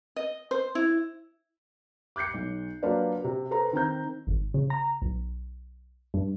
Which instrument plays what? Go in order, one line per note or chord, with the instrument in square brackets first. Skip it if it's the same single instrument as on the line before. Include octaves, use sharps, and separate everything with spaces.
[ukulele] D#5
C5
E4
[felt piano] D6 F#6 G6 C7 C#7
B1
F#3 A#3 D4 F4 B4 D5
C3
A4 B4 C5 A#5
D#3 C4 A#5 G6
[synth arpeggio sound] G#1
C#3
A#5
B1
G2